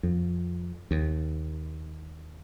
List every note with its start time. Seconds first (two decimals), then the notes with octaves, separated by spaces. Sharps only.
0.03 F2
0.91 D#2